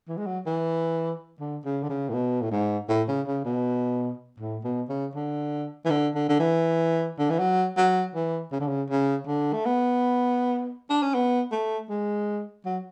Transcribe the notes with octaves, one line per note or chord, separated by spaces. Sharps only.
E3
G#3
F#3
E3
D3
C#3
D3
C#3
A2
B2
A2
G#2
A2
C#3
C#3
B2
A2
B2
C#3
D3
E3
D3
D3
D3
E3
D3
E3
F#3
F#3
E3
C#3
D3
C#3
C#3
D3
A3
B3
D4
C#4
B3
A3
G#3
F#3